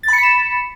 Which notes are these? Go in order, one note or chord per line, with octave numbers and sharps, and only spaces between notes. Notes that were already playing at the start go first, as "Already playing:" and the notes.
B5 A6 B6 C#7 E7